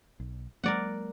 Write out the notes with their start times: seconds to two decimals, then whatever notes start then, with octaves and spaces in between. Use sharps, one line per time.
0.20 B1
0.64 F#3 G#3 A#3 A#4 D5 F#5